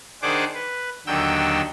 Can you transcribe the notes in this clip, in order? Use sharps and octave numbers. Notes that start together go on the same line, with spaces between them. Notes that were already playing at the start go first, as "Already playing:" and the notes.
D#3 D4 G#4 C5 F#5 D6
B4
D#2 D3 F#3 G5 E6